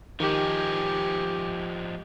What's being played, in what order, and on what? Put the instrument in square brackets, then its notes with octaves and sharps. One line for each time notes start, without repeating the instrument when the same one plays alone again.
[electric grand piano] D#3 [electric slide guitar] F3 G#3 [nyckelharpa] G4